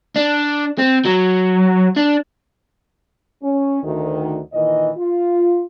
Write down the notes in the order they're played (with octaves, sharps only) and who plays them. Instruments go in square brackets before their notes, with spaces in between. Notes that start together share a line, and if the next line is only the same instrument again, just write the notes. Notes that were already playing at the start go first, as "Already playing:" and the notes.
[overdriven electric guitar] D4
C4
F#3
D4
[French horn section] C#4
D2 D#3
A#2 D#3 E3 D#5
F4